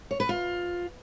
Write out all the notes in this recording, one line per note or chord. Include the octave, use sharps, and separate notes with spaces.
C#5
B4
F4